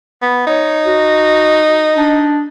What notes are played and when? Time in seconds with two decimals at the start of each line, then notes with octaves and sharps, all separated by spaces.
0.22 B3
0.47 D#4 C#5
0.84 F#4
1.96 D4